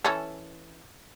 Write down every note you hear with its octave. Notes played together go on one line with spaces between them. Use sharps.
E3 C#4 A4